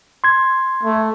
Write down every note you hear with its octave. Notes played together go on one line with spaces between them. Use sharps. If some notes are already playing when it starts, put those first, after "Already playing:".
C6 G#6
A3